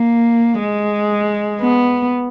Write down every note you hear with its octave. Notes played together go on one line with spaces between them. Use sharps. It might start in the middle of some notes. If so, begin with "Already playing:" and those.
Already playing: A#3
G#3
B3